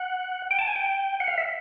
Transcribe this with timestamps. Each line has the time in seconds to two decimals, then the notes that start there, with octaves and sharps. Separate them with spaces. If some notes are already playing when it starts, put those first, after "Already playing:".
Already playing: F#5
0.51 G5
0.59 A5
0.67 G#5
0.76 G5
1.20 F#5
1.28 F5
1.38 E5